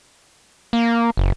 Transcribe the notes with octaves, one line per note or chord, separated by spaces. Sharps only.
A#3
F#1